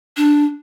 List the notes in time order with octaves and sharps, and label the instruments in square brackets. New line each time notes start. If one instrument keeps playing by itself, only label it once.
[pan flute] D4